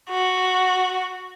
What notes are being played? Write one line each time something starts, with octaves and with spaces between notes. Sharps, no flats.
F#4